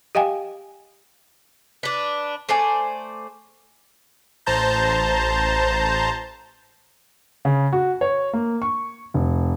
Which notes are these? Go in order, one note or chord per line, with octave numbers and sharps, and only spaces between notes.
G4 D#5 F5 G5 G#5
D4 B4
A3 C5 D5 G#5
A1 C5 A5 A#5 G6
C#3
F#4
C#5
A#3
C#6
F1